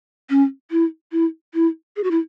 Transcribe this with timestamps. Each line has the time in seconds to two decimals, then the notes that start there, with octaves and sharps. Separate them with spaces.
0.30 C#4
0.71 E4
1.12 E4
1.54 E4
1.96 G#4
2.04 F#4
2.11 E4